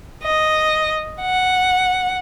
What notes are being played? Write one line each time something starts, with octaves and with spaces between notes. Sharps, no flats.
D#5
F#5